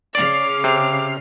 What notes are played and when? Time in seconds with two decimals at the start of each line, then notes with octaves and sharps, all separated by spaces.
0.15 C#3 D5 D6 F6 C7
0.64 C3